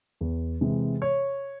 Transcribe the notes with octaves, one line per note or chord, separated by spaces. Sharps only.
E2
C3 E3 G#3
C#5